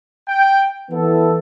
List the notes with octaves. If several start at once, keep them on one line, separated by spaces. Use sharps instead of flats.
G5
E3 B3 E4 A4